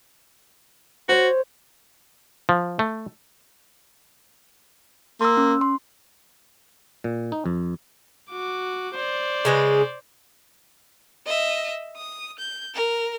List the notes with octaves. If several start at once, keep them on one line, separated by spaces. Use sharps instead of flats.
F#4 C5 C#5
F3
A3
A#3 C6 E6
C#4
C6
A#2
D#4
F2
F#4 D6
C5 D5
C#3 G#3 B4
D#5 E5
D#6
G6
A#4